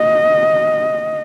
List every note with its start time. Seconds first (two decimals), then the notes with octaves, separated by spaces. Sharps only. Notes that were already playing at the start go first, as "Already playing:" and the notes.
Already playing: D#5